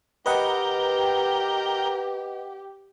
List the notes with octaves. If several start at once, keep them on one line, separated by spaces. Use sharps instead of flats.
G4 A#4 B4 D#5 F#5 G5